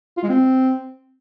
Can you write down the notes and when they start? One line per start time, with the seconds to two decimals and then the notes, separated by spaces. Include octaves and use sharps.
0.17 F4
0.23 G#3
0.29 C4